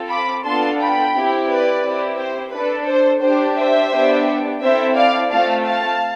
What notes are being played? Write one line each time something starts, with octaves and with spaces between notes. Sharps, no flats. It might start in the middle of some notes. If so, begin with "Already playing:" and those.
Already playing: C4 F4 A4
B5 D6
B3 D4 F4 A4 A5 C6
G5 B5
C4 E4 G4
B4 D5
C4 E4 G4
C5
D4 A4 B4
C5
D4 G4 C5
C5 E5
B3 D4 G4
C4 E4 A4 C5 E5
D5 F5
A3 C4 F4 A4 F5 A5
F5 A5